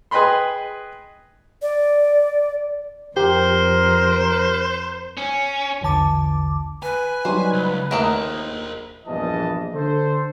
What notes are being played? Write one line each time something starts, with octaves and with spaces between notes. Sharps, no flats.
G#4 B4 D#5 G5 B5 C6
D5
F2 G4 A#4 C5
C#4
A#1 E2 D3 A5 D6
B4 G#5
F#3 G3 D#4 C5
C#2
D#2 D#3 A3 D#4 A#4 C5 E5
A#1 E2 G2 E3 D#5 A5
D3 A4 C5